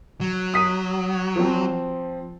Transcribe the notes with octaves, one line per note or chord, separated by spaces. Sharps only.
F#3
D#6 B6 D#7
F3 C4